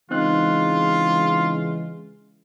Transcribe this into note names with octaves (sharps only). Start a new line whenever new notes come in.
C#3 E3 G#3 C4 D#4 F4 F#6